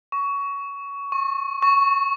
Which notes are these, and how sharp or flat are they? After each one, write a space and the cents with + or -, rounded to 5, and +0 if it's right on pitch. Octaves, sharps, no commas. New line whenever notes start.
C#6 +20
C#6 -30
C#6 +5